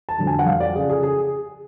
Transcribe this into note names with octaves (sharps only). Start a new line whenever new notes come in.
A5
F2 D3 F#3
G#5
F#5
F2 F5
D5
C#3 F3 G#4
G#4
G#4